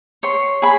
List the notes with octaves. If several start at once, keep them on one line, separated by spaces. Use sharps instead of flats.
C#5 C6
G#4 B5